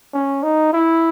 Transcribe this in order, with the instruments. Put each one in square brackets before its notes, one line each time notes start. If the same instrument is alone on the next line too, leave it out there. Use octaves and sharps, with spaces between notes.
[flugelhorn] C#4
D#4
E4